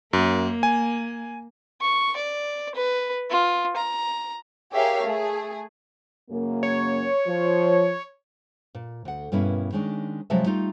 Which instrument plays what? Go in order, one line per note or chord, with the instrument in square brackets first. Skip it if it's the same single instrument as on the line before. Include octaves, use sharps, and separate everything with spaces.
[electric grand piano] F#2 [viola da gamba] A#3
[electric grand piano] G#5
[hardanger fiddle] C#6
D5
B4
F4
A#5
[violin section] G4 G#4 A#4 C#5 E5 F5
A3 G#4
[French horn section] F#2 C#3 A#3
[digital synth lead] C#5
[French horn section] F3
[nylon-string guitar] A#2
D2 F#5
G2 B2 A#3 C#4 E4
D#3 G#3 C#4 D4
C3 F3 F#3 G#3 E5 A5
G3 A3 D#4 F4